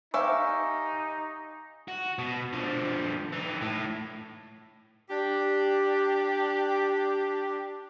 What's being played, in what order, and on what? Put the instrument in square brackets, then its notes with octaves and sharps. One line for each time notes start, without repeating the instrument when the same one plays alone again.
[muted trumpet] D#4 [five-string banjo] G4 E5 F5 [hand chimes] G#5 [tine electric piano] C#6
[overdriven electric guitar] F#4
B2
D3 F3
E3 D#4
A2
[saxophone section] D4 G4